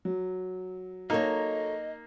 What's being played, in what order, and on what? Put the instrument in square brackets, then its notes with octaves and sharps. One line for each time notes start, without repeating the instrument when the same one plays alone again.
[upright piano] F#3
[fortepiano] A#3 D#4 [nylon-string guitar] A4 C#5 [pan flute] D#5